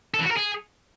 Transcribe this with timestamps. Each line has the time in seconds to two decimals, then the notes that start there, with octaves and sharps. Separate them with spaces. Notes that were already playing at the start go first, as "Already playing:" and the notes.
0.14 A4
0.20 E3
0.25 F#4
0.31 A#4
0.36 G#4